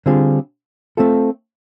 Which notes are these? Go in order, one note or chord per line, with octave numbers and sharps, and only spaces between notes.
D3 G3 C4 F4 G#4
A3 C4 F4 A4